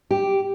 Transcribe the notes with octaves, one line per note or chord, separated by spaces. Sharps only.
G4